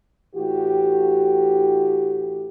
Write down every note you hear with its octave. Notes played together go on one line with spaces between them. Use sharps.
A2 E3 F#4 G4